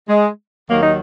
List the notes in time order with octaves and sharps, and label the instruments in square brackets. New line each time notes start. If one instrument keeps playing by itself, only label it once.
[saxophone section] G#3
D#2 D#3 F#3 A#3
D#4